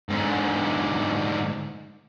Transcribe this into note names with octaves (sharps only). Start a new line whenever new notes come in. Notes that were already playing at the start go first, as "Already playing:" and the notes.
G#2 D3